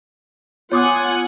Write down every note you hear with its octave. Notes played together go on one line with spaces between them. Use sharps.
B3 F4 C#5 F#5 G#5 D6 D#6